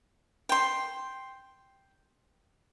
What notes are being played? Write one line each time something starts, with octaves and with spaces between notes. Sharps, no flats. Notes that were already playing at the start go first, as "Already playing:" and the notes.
G5 C6